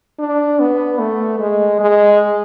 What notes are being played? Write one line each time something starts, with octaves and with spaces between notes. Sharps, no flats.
D4
B3
A3
G#3
G#3